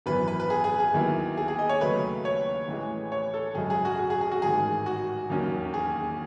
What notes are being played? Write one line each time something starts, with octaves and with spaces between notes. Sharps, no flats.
G#1 F#2 E3 B3 B4
B4
B4
G#4
G#4
G#4
D#2 D#3 F#3 B3 E4
G#4
G#4
D#5
C#5
D#2 C#3 F#3 A3 B4
C#5
A1 A2 E3 G#3
C#5
A4
G#1 F#2 C#3 G#3 G#4
G#4
F#4
F#4
G#4
G#4
F#4
A1 G#2 D#3 G#4
F#4
E1 D#2 D#3 F#3 C#4
G#4